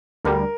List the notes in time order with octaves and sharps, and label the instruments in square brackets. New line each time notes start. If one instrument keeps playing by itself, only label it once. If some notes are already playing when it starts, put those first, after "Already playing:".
[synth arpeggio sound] D2 D3 G3 [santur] A#4